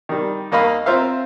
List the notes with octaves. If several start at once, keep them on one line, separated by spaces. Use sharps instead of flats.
D#3 G3
D#2 A#3 D#5 F5 B5
C4 F4 A#4 C5 E5 F5